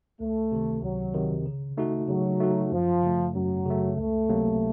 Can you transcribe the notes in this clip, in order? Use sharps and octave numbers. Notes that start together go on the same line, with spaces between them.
C#2 A3
C3 D#3
C#2 F#3
C3 D#3
C#3
A3 D#4 F#4
C#3 F#3
A3 D#4 F#4
F#2 F3
C#3 A3
F#2 F#3
C#3 A3
C#2 A3
C3 F#3 A#3